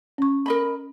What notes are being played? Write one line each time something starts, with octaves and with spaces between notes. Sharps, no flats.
C#4 C#6
A#4 D#5 B5